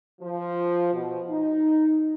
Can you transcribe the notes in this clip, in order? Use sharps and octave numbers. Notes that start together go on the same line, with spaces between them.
F3
B2
D#4